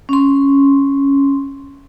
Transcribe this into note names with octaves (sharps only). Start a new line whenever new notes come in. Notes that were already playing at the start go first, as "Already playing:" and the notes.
C#4 C6